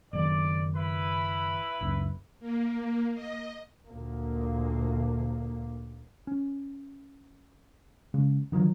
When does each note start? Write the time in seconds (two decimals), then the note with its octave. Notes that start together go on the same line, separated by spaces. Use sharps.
0.13 F#1 D#3 D5
0.76 E4 B4 B5
1.81 F#1 C#2
2.40 A#3
3.14 D#5
3.89 D2 A#2 A#3
6.27 C#4
8.14 C#3 G#3
8.52 D3 D#3 F3 F#3